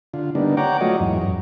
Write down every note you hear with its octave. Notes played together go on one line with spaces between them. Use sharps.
D3 F4
D3 G3 A#3 B3 D4 D#4
C#5 F#5 G5 A#5 D6
F#3 A3 F4 F#4 C#5 D#5
E2 G#2 F#3
F#2